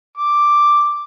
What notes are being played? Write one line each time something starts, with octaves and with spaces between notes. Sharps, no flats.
D6